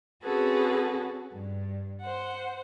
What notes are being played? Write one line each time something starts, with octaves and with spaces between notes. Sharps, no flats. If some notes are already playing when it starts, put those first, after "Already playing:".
C4 C#4 F#4 G#4 A4 B4
G2
C5 F#5